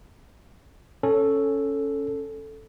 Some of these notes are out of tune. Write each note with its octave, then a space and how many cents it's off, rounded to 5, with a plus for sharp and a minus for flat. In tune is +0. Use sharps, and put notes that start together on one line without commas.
C#4 +0 A4 +0